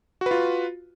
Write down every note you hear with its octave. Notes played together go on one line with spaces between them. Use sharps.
F4 F#4 B4